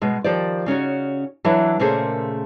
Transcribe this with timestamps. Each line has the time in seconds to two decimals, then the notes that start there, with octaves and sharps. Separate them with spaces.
0.01 B2 G#3
0.24 D#3 F3 G4 C5 D5
0.66 C#3 C#4 D#4 F#4
1.44 E3 F#3 D4 E4 E5
1.79 A#2 C#3 A3 A#3 G#4 C5